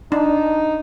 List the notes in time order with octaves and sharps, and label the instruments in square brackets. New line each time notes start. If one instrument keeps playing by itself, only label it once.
[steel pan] D4 [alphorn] D#4